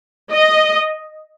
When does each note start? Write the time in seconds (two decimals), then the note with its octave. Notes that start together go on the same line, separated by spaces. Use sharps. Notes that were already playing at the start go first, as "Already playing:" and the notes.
0.31 D#5